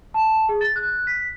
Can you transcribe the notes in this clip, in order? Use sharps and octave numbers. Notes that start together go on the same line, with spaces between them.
A5
G#4
A6
F#6
B6